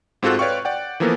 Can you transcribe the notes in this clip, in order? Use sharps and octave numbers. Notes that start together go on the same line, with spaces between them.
G#2 C4 F4 F#4 A4 F#6
B4 C#5 D5 F5 G5 C#6
D5 F#5 G5
E3 F3 A#3 B3 A4 A#4